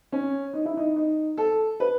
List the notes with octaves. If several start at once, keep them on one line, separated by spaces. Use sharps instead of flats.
C#4
D#4
E4
D#4
D#4
A4
B4